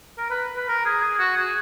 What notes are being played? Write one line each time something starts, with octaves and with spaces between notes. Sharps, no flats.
A#4
B4
B4
A#4
G#4
G#4
F#4
G#4